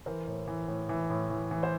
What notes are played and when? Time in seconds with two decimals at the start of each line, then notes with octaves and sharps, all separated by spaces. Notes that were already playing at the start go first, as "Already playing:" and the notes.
0.06 E3 A#4 C5
0.27 A2
0.48 E3
0.68 A2
0.89 E3
1.10 A2
1.30 E3
1.51 E3
1.63 C5